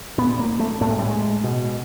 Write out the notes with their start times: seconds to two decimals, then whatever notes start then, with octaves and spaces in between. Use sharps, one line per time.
0.18 A#2 B3
0.39 A#3
0.60 A3
0.81 A2 A3
0.90 G#3
0.99 G3
1.07 G#3
1.44 B2